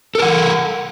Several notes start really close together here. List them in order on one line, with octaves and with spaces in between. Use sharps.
A4 A#4 F#5